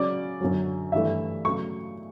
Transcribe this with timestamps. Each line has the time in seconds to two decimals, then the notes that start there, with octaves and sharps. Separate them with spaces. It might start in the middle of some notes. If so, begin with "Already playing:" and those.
Already playing: C#3 F#3 C#4 D5
0.41 F#2 D3 F#3
0.92 G2 E3 A3 E5
1.45 C#3 F#3 A3 C#6